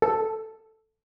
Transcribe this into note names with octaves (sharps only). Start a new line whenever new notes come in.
A4